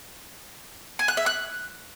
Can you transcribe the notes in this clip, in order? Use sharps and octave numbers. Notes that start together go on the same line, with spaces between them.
G#5
F#6
E5
F#6